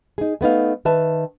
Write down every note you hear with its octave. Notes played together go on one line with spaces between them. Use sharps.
D#4 G#4
A3 B3 D#4 F5
D#3 B4 E5 A5